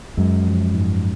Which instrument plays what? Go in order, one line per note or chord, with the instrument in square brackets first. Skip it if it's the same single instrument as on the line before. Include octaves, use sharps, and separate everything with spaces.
[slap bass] F#2 [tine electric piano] G#3
[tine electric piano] F3
G#2